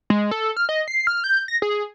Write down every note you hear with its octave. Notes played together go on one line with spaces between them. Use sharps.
G#3
A4
F6
D#5
C7
F6
G6
A#6
G#4